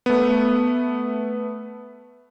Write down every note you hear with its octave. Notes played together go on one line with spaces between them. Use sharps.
A3 B3